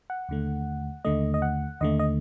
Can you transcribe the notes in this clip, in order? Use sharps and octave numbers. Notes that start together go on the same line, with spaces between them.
F#5
D#2 D3 A3
D#2 D3 A3 D#5
D#5
F#5
D#2 D3 A3 D#5
D#5